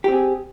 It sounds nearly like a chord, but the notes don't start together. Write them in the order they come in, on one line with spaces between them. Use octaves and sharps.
G4 C4 G#4